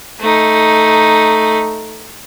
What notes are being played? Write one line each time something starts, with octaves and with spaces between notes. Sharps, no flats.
A3 D#4